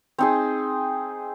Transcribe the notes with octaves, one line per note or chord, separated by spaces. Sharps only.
C4 D#4 G#4